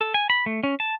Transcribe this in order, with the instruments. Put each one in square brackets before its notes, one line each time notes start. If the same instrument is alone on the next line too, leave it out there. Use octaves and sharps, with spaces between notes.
[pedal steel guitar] A4
G#5
B5
A3
C#4
A5